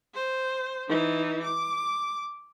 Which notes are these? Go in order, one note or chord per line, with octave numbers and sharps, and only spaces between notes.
C5
E3 D#4
D6